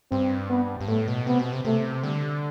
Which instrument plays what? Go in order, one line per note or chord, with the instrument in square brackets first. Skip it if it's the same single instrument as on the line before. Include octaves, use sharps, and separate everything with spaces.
[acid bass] G2 [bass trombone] C4
[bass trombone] B3
[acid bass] G2
[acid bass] A2 [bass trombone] A3
[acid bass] B2
[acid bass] C3 [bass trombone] B3
[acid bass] B2
C3
[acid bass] C3 [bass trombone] A3
[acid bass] D3 [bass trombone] G3